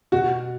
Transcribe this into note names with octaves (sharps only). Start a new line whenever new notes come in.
B2 F#4